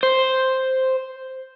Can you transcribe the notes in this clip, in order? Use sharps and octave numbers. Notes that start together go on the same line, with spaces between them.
C5